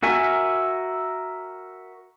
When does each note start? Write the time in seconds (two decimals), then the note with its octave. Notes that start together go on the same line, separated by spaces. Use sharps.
0.03 F#4 A#4 E5 G#5